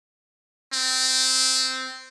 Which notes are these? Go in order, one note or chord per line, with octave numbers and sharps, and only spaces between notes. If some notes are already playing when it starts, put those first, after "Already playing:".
C4